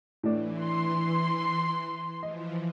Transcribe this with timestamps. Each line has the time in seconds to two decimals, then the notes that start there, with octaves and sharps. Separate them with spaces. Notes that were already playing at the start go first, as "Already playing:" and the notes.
0.23 A2 E3 D4
0.61 C6
2.23 E3 F3 D#5